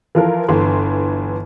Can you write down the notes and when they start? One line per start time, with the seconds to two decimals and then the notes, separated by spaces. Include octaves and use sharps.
0.15 E3 F3 F4 A4 A#4
0.48 G1 D3 E3 C6